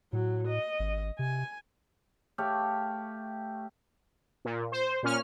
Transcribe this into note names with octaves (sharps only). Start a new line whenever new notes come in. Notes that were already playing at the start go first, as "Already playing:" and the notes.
A2 F#3
D#5
G#1
C3 G#5
A3 G4 C#5 F5
A#2
C5
A#2 C#4 F6